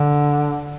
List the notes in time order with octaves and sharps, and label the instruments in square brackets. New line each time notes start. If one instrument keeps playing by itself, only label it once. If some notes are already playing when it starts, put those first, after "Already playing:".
Already playing: [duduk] D3